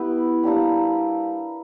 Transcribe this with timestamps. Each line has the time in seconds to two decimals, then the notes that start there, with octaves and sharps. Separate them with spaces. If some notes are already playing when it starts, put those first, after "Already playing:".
Already playing: B3 E4 G4
0.43 G3 A#3 D4 G4